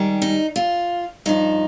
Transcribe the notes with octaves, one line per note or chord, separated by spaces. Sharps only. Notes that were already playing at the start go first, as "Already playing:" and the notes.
Already playing: G#2 D#3 G3
D#4
F4
G2 F3 D#4